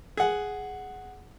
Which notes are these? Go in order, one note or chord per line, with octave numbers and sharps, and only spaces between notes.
G#4 F#5